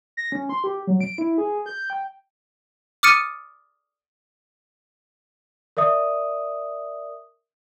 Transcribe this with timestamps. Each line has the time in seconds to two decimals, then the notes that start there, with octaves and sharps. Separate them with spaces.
0.17 A#6
0.32 C#4
0.49 C6
0.64 G4
0.87 F#3
1.01 D7
1.18 E4
1.38 G#4
1.66 G6
1.90 G5
3.03 D6 D#6 F6 A6 C#7 D#7
5.77 A#4 D5 E5 D#6